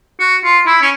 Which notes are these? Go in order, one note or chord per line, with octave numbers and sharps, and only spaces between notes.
F#4
F4
E4
C#4